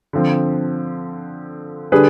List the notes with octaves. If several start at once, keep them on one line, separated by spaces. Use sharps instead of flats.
D3 F3 C4
D3 G3 D4 G#4 B4